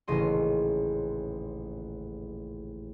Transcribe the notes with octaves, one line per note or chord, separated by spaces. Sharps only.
D#1 A1 C#3 D#5 C6